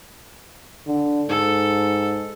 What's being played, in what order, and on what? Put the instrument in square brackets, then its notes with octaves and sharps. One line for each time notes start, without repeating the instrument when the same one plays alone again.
[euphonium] D3
[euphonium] G#2 [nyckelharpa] A4